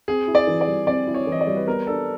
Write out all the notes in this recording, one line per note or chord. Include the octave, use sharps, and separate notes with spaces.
C4 G#4
E4
D5
E3
D5
G3
C4 D5
E4
C#5
E3 D#5
D5
G3
B4
B3 A#4
D4 A4